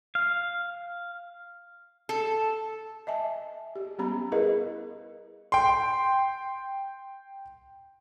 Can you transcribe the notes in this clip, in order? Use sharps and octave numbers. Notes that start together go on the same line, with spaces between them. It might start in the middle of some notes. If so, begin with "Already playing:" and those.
F5
A4
D#5 E5 G#5 A5
G4
G3 B3 C#4 G4 A#5 B5
E4 G#4 A#4 B4 D#5 F5
G5 C6